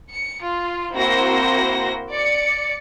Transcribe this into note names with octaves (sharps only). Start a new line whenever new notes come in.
C#7
F4
A#3 C4 E4 F#4 C5 A#6
D5 C#7